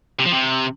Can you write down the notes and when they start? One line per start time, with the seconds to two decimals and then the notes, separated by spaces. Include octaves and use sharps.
0.20 C3
0.26 F3
0.32 C3